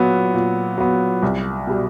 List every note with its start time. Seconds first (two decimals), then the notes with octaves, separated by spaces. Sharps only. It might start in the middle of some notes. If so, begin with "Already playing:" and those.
Already playing: A#2 F#3 B3
0.34 A#2
0.78 F#3 B3
1.23 C2
1.67 B2 G3